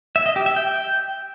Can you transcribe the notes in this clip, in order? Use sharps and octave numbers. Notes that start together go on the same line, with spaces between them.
E5
D#5
G4
E5
G5